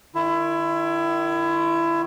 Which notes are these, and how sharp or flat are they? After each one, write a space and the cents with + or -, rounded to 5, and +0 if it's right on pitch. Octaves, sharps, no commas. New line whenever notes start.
D#3 -30 E4 +25